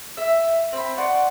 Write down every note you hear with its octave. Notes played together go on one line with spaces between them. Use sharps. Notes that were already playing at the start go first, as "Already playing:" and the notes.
E5
C4 B5
D5 F#5 C6 C#6